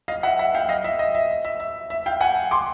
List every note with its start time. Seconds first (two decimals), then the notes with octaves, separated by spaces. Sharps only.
0.08 D#5 F5
0.23 E5 F#5
0.39 E5 F#5
0.55 F5 G5
0.69 D#5 F5
0.84 E5
0.99 D#5
1.15 E5
1.45 E5
1.60 E5
1.90 E5
2.06 F5 G5
2.21 F#5 G#5
2.51 C6 D6